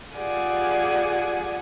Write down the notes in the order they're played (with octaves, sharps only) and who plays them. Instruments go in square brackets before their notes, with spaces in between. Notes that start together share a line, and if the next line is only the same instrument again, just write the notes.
[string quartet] F4 G4 G#4 D5 F#5 G#5